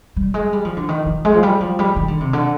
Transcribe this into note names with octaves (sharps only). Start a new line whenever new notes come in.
G3
G#3
G3
F3
D3
D#3
F3
G#3
F3
G3
F3
G3
D#3
D3
C3
D3